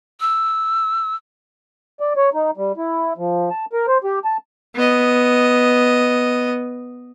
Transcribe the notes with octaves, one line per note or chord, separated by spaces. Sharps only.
E6
D5
C#5
D#4
G3
E4
F3
A5
A#4
C5
G4
A5
B3 D#5